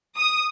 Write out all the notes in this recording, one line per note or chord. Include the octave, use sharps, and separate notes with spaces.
D#6